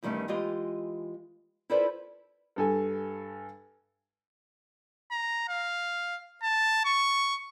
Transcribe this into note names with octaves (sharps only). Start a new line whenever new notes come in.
E2 G2 D#3 A3 C#4
E3 G#3 F4 G4 D#5
E4 F4 A4 B4 C5 D5
G2 A4 G#5
A#5
F5
A5
C#6